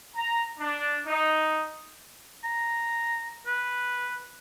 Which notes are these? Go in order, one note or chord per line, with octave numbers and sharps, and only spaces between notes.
A#5
D4
D#4
A#5
B4